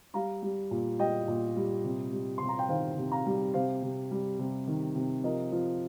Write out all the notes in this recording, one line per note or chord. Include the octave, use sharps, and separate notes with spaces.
G3 F5 A#5
G3
A#2
G3 D#5 G5
A#2
G3
C3
G3
C3 C6
A#5
G5
D#3 C5 F5
C3
F5 A#5
G3
C3 C5 F5
C3
G3
C3
D#3
C3
F3 A#4 D#5
F3